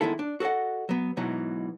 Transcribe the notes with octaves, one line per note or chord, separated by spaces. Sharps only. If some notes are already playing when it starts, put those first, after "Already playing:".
E2 G#2 D#3 G#3 E4 A4
D4
F#4 A4 D5 D#5 F#5
F#3 B3
G#2 B2 E3 F#3